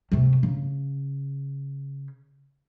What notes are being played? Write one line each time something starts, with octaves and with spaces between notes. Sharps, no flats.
C3 A3
C#3